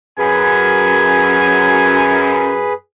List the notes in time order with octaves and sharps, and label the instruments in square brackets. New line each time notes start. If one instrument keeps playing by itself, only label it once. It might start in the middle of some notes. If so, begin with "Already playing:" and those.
[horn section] F#2 [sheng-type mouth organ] G#4 B4 [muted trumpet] G#5